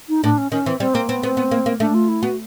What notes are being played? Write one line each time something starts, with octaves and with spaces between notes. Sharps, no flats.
D#4
A2 D4
C#4
D#3 C#4
E3 C4
G3 C4
A#3 C4
B3 C4
B3 C4
B3
A#3
A#3
A3 D4
F4
E4
B3 F#4